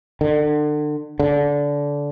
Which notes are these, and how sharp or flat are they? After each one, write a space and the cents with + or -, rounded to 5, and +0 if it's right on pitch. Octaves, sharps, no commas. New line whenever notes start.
D3 +30
D3 -20